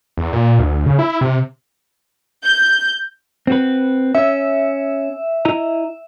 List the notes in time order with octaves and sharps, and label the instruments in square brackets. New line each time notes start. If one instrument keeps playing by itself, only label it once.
[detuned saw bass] E2
A#2
D2
C#3
E4
C3
[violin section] G6
[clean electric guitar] C4 F#4 B4
[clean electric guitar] C#4 [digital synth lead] E5
[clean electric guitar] E4 D#5 A#5